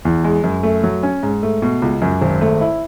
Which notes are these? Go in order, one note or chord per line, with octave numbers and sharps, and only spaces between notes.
E2
G#3
F#2
A3
F#3
C#4
G#2
A3
B2
C#2
F#2
G#1
A3
E4